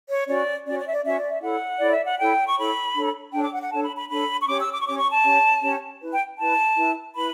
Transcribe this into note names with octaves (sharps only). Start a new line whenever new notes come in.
C#5
C#4 F#4 C#5 D5
C#4 F#4 C#5 D5
D5
E5
D5
C#4 F#4 C#5 E5
D5
E5
E4 A4 C#5 F#5
E4 A4 C#5 D5
E5
F#5
E4 A4 C#5 G5
C#6
E4 A4 C#5 B5
D4 A4 C#5
D4 A4 C#5 G5
D6
F#5
F#5
D4 A4 C#5 A5
B5
B5
D4 A4 C#5 B5
C#6
C#4 G4 C#5 D6
E6
D6
C#6
C#4 G4 C#5 D6
C#6
A5
C#4 G4 C#5
C#4 G4 C#5
E4 B4
G5
E4 B4 A5
E4 B4
E4 B4 B5